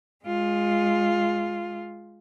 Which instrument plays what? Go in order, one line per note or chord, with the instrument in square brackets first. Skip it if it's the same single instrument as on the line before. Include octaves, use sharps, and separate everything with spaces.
[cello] G#3 F4